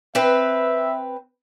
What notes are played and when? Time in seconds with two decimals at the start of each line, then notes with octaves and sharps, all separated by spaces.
0.15 C4 B4 E5